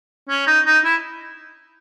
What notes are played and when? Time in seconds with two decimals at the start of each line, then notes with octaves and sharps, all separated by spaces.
0.29 C#4
0.47 D#4
0.66 D#4
0.85 E4